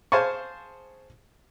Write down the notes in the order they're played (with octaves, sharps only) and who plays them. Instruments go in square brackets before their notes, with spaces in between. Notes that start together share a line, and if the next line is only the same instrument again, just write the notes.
[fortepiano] G#4 C5 F5 G#5 A5 C#6